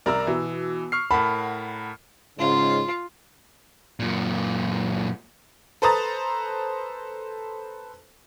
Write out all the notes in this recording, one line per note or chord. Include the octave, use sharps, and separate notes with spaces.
C2 A#4 D5 A#5 E6
B2 E3
C#6 F6 C7
A2 A#4 F#5 A5 B5
G#2 C#3 F4
F#2 A#2
A4 B4 C5 A#5 D#6 A6